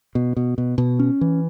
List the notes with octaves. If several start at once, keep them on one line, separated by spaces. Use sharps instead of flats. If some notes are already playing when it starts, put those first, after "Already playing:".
B2
B2
B2
B2
C#4
E3